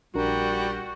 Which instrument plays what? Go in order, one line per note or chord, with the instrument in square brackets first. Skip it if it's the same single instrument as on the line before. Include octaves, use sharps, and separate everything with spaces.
[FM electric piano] A#1 D4 A#4 [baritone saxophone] G3 [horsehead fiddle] F#4